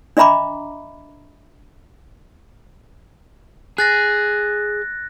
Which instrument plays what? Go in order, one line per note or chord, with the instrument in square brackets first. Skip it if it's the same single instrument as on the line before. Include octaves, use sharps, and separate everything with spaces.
[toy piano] D4 D#5 E5 A#5 B5 D6
[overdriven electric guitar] G#4 [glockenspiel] F#6 A6 A#6